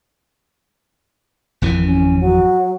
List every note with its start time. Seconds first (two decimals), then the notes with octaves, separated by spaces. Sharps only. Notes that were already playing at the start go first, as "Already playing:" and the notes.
1.62 G#1 F2 E3
1.84 C#4
2.20 F#3